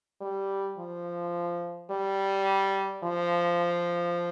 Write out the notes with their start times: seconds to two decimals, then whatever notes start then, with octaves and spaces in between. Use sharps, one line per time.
0.21 G3
0.78 F3
1.91 G3
3.04 F3